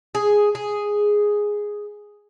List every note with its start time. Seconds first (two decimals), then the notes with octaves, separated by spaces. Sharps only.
0.15 G#4
0.55 G#4